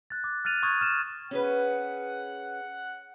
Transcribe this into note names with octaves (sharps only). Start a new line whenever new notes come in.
F#6 A6
D6
F6 F#6 A6 D#7 F7
C#6 D#6 G#6
F6 E7
C#4 G#4 B4 F#5